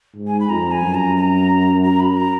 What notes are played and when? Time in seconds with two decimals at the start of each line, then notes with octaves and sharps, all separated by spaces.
0.16 G#2
0.27 G#5
0.40 B5
0.49 F2 A#5
0.72 G#5
0.83 F#2
0.94 A#5
1.17 A#5
1.83 A#5
2.00 B5
2.17 A#5